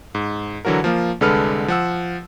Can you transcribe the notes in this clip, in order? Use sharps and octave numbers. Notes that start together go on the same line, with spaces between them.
G#2
D3 E3 F#3 F#4 A#4
F3 A#3 F4
C2 D3 G#3 A4 B4 F6
F3 F#5 E6